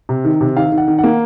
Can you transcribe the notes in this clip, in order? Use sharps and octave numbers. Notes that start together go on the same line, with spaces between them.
C3
D#3
C3
D#3 F5
D#3
F#5
D#3
F#5
A#3